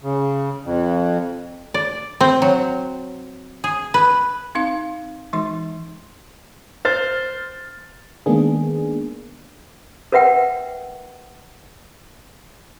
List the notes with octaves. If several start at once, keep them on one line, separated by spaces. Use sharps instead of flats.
C#3
F2
D5
C4
F#3
G#4
B4
C4 D#4 F5
E3 G#3 D#4 C6
C5 F6 A6
D#3 G#3 A#3 B3 D4 G#4
A#4 B4 E5 F#5 G5